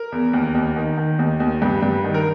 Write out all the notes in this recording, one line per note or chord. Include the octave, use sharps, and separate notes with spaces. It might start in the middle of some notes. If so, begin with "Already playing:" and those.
Already playing: A#4
E2
D#2
D#2
D#3
D#3
D#2
D#2
G2
G2
D#3
A#4